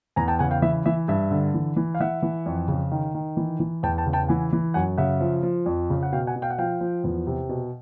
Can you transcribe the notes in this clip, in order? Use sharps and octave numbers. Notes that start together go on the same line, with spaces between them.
E2 G#5 A#5
G5 A5
C#3 F#5 G#5
F5 G5
E3 E5
E3 E5
G2 E5
D3
E3
E3
F5
E3 E5 F#5
E3
F2
C#3
D#3
D#3
E3
E3
E2 G5 A5
G5 A5
C#3
G5 A5
E3 F#5 G#5
E3
F#2 F#5 G#5
C#3 E5 F#5
F3
F3
F2
C#3
F#5
B2 F5 G5
F#5 G#5
B2
F5 G5
F#5
F3 F5 G5
F3
E2
C3
B2